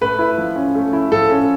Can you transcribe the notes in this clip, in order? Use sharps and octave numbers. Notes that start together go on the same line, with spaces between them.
A3 B4
E4
F3
C#4
A3
E4
F3 A4
C#4